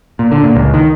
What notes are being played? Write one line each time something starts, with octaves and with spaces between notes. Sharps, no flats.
A#2
D3
A#2
C#2
D#3